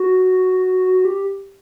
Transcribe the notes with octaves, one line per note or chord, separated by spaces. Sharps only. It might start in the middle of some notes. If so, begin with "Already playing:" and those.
Already playing: F#4
G4